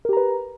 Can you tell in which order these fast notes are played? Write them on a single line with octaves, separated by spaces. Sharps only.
A#4 G4 A#5 B4